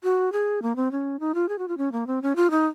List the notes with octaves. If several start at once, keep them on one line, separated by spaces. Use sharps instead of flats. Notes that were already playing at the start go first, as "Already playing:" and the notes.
F#4
G#4
A#3
C4
C#4
D#4
F4
G#4
F#4
F4
C#4
A#3
C4
C#4
F4
D#4